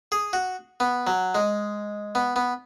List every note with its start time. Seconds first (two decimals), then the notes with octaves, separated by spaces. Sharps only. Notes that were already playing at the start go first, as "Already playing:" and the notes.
0.12 G#4
0.33 F#4
0.80 B3
1.07 F#3
1.35 G#3
2.15 B3
2.36 B3